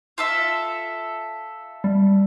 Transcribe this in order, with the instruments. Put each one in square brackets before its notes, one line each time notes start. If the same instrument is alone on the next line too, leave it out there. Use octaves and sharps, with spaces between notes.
[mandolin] F4 A4 E5
[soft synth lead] G3